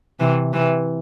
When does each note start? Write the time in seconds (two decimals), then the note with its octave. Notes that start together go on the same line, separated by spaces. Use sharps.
0.20 C3 E3
0.53 C3 E3